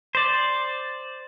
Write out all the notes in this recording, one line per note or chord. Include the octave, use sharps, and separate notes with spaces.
C5 D5